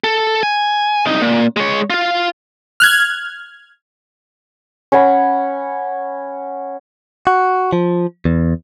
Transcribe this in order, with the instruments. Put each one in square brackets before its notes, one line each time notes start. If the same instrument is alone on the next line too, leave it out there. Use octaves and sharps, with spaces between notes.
[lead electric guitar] A4
G#5
C2 D#4
A#2
G#3 C#5
F4 F5
[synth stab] F6 F#6 G#6
[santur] C#4 C#5 F#5 B5
[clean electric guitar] F#4
F3
E2